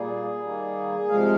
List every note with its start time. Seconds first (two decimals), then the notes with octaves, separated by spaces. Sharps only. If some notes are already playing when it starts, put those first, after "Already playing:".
Already playing: A#2 G3 A#3 G#4
0.42 D#3 G3 A#3
1.09 C3 F3 G#3 F5